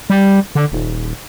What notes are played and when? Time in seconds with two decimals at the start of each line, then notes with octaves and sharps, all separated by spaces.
0.10 G3
0.55 D3
0.72 D#1